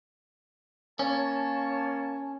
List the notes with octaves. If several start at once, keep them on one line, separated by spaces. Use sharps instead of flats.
A#3 C#4 C#5 A5